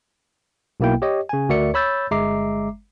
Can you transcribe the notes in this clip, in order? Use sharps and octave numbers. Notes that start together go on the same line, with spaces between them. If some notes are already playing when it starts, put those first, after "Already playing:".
B1 B2 A#3 E4 G5
G4 C#5 D#5
C#3 G#5
D2 F#4 A#4 D5 E5 C#7
C#5 B5 E6 G6 A6
G1 G#3 E5 A#5 D6 C7